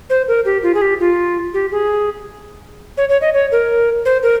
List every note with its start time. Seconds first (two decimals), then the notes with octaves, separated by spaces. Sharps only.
0.10 C5
0.28 A#4
0.45 G4
0.63 F4
0.75 G#4
0.82 G4
1.00 F4
1.54 G4
1.72 G#4
2.97 C#5
3.09 C#5
3.21 D#5
3.34 C#5
3.52 A#4
4.05 C5
4.23 A#4